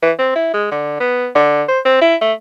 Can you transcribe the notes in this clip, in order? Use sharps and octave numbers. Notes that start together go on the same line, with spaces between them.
E3
C4
E4
G#3
D3
B3
D3
C5
C4
E4
A3